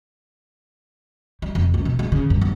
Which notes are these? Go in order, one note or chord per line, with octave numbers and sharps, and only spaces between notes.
G3
F1
C#2
B2
G#3
C#3
G2
G1